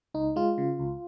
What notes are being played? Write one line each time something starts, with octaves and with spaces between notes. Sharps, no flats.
C#2 D#4
G#3 F4
C#3
C#2